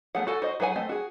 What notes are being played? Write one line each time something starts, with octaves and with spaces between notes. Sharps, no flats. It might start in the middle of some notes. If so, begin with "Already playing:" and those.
A3 B3 G#4 F#5
F#4 A4 G#5
F#4 C5 D#5
F#3 G#4 B4 F#5 G#5
A3 C4 D#5
F#4 G#4